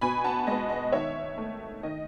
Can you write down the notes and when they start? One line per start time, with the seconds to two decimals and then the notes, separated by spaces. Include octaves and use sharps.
0.01 B2 G#5 B5
0.24 F#5 A5
0.47 G#3 B3 D#5
0.70 D#5
0.92 D#3 C#5 E5
1.38 A3
1.83 D#3 D#5